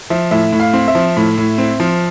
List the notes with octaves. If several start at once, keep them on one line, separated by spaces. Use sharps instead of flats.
F3 E5
A2 E5
A2
F5
C4
E5
F3
A2
A2
C4
F3